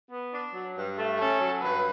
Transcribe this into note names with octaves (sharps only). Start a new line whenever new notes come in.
B3
D4
F#3
G2
A3
C#4 A4
F#3
G2 B4